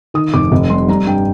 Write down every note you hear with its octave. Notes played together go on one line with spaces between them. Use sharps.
D#3 D#6
F1 D6
F1
G3 C6
G3 A#5
G2 G5